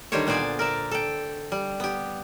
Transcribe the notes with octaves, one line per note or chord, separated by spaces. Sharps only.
D3 D#3 G3 G4 C5 C#5
A#2 B3 C5 D5 G#5
A#4 D5 E5
A4 G5
G3
B3 G4